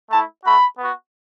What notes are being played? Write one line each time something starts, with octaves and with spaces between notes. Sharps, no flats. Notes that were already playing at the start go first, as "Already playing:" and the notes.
A3 E4 A5
A3 F#4 B5
B3 F#4